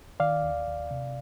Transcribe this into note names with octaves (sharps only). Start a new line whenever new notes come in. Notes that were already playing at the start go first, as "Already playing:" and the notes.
D#3 D5 F5
D#2
D#2
C3